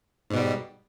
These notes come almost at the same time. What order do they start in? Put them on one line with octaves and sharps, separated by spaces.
G#2 B2 G3